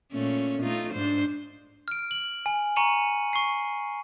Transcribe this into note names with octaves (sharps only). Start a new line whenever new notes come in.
A#2 A3 C#4
A3 D#4 F4
G#2 D4 C5
F6 D7
F#7
G#5
G#5 A#5 C#6 C#7 D#7 F#7
C#6 C7